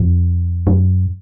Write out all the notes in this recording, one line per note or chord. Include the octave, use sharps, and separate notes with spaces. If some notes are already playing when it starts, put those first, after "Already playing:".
Already playing: F2
F#2